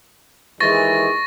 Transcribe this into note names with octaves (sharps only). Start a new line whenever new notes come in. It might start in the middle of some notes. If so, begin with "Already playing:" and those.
D#2 E3 G#3 C#6 A6 A#6